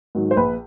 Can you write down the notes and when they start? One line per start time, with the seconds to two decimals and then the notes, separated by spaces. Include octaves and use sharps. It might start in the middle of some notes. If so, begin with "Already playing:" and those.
0.15 G#2 D#3 F#3
0.31 C5
0.37 A#1 B4